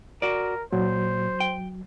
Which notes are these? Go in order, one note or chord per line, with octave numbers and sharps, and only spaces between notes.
F#4 A#4 D5
A#2 F#3 C5
G5